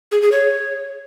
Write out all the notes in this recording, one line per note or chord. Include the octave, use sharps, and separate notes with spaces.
G#4
G#4
C#5